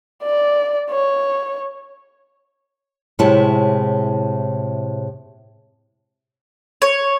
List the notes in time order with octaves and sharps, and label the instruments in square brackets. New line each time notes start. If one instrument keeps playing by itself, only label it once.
[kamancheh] D5
C#5
[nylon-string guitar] A2 C3 G#3 E4 C#5 A5
[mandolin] C#5